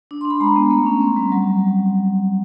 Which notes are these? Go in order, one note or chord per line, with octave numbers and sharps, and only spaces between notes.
D4
C6
D4
B5
G#3 A#5
B3
A3
C#4
C4
G3
F#3